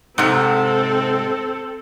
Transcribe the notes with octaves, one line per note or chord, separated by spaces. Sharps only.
G#2 C3 C4 A4